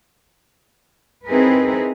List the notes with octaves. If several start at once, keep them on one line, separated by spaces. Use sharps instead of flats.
C4 D#4 E4 G#4 A#4 B4